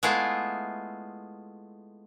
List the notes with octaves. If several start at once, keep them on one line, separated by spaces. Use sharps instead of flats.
G#3 A3 B3 E4 F4